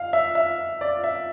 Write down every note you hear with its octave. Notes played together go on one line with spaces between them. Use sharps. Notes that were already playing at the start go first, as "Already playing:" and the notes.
Already playing: F5
E5
E5
D5
E5